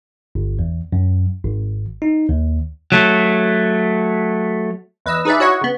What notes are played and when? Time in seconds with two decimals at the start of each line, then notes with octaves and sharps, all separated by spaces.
0.35 G1
0.59 E2
0.92 F#2
1.44 G#1
2.02 D#4
2.29 D#2
2.92 F#3 A3
5.06 E2 B4 D#5 E6
5.25 D#4 G#4 B4 D5 E5
5.39 E4 F#4 C#5 D#5 F#5 C#6
5.61 C#3 B3